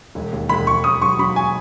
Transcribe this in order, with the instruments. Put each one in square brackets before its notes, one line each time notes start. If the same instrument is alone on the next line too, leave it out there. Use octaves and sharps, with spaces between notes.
[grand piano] E1
D#2
E1 B5
E1 C#6
E1 D#6
F#3 C#6
F#3 B5
G#5